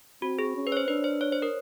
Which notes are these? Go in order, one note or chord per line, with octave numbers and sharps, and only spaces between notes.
C4 F#4
G#4
C#4
B4
C#5
C5
D4 B4
C5
C#5
C5
A#4